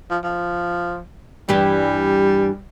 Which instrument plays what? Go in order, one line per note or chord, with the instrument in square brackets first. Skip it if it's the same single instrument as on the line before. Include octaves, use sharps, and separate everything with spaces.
[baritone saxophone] F3
F3
[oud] G2 E3 G4 [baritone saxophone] G3